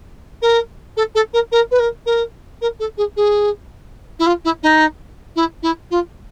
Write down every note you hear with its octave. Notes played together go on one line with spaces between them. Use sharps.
A#4
A4
A4
A#4
A#4
B4
A#4
A#4
A#4
A4
G#4
G#4
E4
F4
E4
D#4
E4
E4
F4